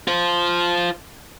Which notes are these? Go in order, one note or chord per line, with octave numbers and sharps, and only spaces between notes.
F4 C5